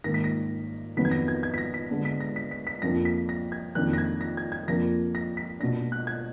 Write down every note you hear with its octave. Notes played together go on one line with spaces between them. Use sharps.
G#2 D#3 A#3 A#6
B6
A#6
F2 D#3 F#3 B3 B6
G#6
A#6
G#6
G#6
B6
A#6
B6
D3 G#3 B3 D4
B6
A#6
B6
B6
B6
F2 F3 A#3 D4 A#6
B6
A#6
G#6
F2 D#3 F#3 A#3 D4 F#6
A#6
G#6
A#6
G#6
G#6
F2 F3 A#3 D4 A#6
A#6
B6
B2 A#3 D4 A#6
F#6
G#6